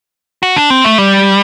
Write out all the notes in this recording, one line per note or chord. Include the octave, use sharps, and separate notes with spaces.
F#4
D4
C4
A3
G3